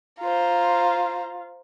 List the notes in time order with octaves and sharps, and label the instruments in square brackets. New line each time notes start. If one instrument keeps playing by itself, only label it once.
[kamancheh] F4 [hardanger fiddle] C5 A#5